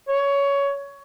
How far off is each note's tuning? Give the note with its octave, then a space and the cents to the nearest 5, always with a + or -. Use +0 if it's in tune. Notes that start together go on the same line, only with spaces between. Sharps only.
C#5 +15